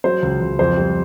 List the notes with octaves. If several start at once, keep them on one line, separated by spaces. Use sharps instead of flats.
F#3 C5
C#2
C#2
F2 C5
G3